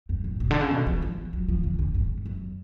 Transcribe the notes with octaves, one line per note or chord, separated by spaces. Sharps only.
F#2
A2
B2
D3
C#3
B2
F3
F3
F#3
F3
D3
D3
G#2
F#2